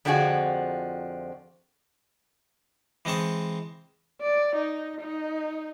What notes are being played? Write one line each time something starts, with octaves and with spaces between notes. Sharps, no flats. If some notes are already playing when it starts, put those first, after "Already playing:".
F2 D3 F3 C4 F#4 G#4
E3 G#3 C4 A5 C#6
D5
D#4
D#4